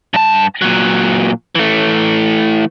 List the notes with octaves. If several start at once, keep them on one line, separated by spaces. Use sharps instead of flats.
G2 A5
A#2 F#3
E3 A3